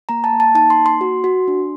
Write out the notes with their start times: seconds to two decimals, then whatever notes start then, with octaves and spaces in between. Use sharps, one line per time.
0.09 A#3 A#5
0.24 A5
0.32 A#3
0.40 A5
0.55 D#4 A5
0.70 C6
0.78 A#3
0.86 C6
1.01 F#4
1.24 F#4
1.48 D4